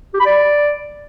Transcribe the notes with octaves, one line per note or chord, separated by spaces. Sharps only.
G4
B5
D5